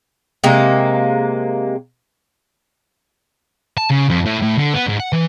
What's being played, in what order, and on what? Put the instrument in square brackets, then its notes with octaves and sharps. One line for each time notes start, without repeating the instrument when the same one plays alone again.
[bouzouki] C3 G#3 A#3
[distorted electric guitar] A5
C#3
F2
A2
A2
D3
B3
G#2
F#5
E3